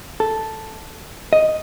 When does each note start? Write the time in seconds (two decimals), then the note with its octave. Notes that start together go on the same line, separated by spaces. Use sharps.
0.20 A4
1.33 D#5